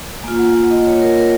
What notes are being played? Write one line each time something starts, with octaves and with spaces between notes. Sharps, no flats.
A#3 F4 G#5
F#5
F#5
D#5
C#5
A#4
A#4